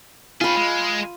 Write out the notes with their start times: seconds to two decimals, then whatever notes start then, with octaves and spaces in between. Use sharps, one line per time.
0.41 D#3 F4 G#4 B5
0.57 G#3